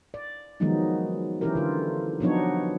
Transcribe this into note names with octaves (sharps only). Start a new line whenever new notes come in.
D5
D#3 F3 F#3 G#3 B3 D#4
E3 C4 C#4 E4 G4 A#4
D3 F4
F3 F#3 B3 D4 D#4 C#5